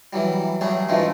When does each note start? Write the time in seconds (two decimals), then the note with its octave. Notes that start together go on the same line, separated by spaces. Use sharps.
0.13 E3 F#3 G3
0.61 F#3 G3 A3 G#4
0.89 G2 D3 E3 F3 G#3 A3